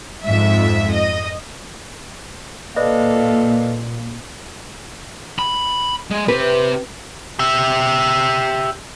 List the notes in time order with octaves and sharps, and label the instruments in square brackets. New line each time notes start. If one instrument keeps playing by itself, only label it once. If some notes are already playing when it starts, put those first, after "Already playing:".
[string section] F2 G#2 E5
D#5
[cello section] A#2 [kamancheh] A4 F5 [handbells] B4 D5 D#5
[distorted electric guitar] B5
G#3
[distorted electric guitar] C4 G4 [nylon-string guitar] B4
[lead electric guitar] G4 E5